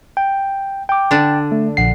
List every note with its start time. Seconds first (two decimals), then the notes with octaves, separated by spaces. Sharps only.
0.17 G5
0.89 G5 D6
1.11 D3 D4
1.52 A3
1.77 A#1 F#5 C7